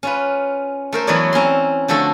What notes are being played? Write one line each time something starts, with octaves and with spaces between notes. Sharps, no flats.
C#4 F4 B4
A3 A#4 C5
E3 F#3 B3 C#5 D5
C4 C#4 A#5 C6
D3 F3 A3 F#4 A4